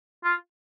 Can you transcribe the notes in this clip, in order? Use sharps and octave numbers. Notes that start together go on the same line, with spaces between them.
F4